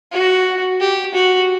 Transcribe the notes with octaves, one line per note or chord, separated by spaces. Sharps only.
F#4
G4
F#4